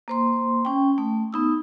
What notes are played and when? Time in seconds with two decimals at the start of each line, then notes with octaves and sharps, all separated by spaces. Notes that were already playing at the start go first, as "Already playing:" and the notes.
0.08 A#3 C5 C6
0.65 C#4 G5
0.98 A3
1.33 B3 D#4 E6